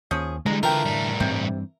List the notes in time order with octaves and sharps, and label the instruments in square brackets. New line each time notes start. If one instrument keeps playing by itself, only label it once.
[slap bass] D#2 [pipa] F3 C#4 G#4
[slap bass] D3 E3 [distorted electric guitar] G3 G#3 [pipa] A#5
[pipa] A3 G5 [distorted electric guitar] F4 B4 [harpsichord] A#4
[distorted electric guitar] A2 G3
[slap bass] G2 E3 C4 [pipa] C3